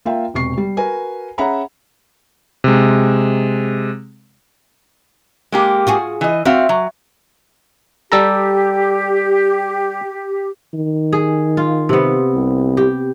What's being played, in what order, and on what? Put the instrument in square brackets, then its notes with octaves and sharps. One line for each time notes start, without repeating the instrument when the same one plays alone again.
[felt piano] A#3 F4 E5 G5
E1 C3 C#6 C7
G3
F#4 A#4 B4 G#5
C#4 G#4 E5 F#5 A#5 B5
[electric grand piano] C3 G#3
[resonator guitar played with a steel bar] G#3 A#3 G4
[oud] F4 F#4 G#4
[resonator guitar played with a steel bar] E3 D#5
[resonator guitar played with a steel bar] C4 F#4 F5 [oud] E5
[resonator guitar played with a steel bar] F#3
[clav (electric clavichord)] G3 A4 A#5 [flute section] G4
[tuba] D#3
[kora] G#4
F4
C3 B3
[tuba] C2
[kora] G4